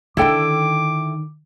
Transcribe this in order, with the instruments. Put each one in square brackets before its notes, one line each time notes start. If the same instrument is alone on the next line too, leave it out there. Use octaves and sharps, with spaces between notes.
[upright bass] D3 D#3 [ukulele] E4 A4 G5 [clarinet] D6